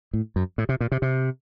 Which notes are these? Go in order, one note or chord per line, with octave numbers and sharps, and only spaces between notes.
A2
F#2
A2
C3
A#2
C3
C3